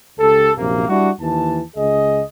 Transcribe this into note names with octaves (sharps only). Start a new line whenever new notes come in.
C#2 G4 A4
A#1 F#2 C3 A#3
G3 D4 E4 F#4
D#2 E3 A5
C#2 G#4 D#5